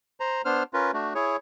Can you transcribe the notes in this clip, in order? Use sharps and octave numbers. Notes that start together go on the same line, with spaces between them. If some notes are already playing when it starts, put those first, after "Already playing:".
C5 A#5
B3 D4 C5 F6
C#4 F4 A#4 B4
A3 D4 F#4
E4 G#4 C#5